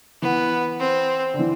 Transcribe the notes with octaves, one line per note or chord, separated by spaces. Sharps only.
E3 B3
C4
D3
E3